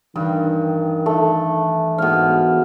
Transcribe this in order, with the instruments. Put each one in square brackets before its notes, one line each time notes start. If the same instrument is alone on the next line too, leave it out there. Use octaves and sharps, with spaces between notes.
[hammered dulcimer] G2 [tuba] D#3 [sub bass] E3
[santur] A3
[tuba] G#2 [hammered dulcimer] B2 F5